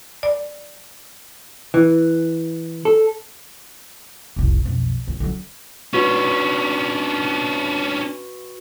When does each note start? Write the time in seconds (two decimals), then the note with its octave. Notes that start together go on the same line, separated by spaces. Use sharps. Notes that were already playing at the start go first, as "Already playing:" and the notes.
0.23 D5
1.74 E3
2.85 A4
4.36 F1 C2
4.65 B1 F2
5.07 D2
5.20 D3 F#3
5.93 C#4 D4 F#4 B4 C#6